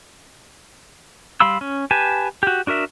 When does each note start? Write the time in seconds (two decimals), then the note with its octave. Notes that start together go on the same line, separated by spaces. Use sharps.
1.40 G3 F5 B5 C6 E6
1.61 C#4
1.91 G4 B4 G#5 A5
2.43 F#4 G4
2.67 D4 F#4 A#4 E5